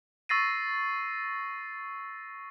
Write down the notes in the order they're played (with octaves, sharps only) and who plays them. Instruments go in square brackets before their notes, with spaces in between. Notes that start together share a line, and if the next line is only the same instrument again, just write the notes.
[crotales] C#6 E6 A6 A#6 C7 D#7